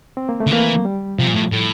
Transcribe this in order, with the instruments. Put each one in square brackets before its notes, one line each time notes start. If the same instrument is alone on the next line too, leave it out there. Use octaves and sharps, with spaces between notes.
[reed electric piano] C4
A#3
A3
[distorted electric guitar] D3
[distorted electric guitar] E3 [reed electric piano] A#3
[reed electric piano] G3
[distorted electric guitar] C3 [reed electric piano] F3
[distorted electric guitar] A#2
A2
A2